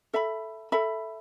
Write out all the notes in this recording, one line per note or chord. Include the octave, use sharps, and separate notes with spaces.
A4 E5 B5
A4 E5 B5